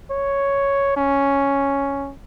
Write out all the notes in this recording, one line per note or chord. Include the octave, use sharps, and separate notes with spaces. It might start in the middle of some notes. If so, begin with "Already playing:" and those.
C#5
C#4